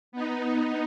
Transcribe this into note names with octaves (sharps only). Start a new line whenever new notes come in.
B3 D#4